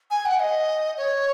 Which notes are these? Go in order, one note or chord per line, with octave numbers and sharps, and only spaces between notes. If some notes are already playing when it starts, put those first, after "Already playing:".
G#5
F#5
D#5
C#5